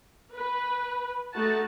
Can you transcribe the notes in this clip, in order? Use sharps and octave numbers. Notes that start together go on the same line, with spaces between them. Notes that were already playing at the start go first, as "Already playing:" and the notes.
B4
A3 D#4 F#4 A5